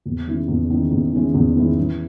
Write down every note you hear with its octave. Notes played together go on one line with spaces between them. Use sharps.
E2
D#3 G#3 C#4 E4
E2
D#3 G#3 C#4 E4
E2
D#3 G#3 C#4 E4
E2
D#3 G#3 C#4 E4
E3